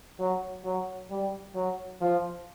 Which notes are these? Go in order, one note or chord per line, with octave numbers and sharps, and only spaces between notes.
F#3
F#3
G3
F#3
F3